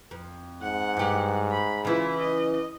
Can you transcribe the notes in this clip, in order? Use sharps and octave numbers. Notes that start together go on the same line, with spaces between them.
F2
G#2 F#5
G2 G4
B5
C#3 E3 E4 F4
D#5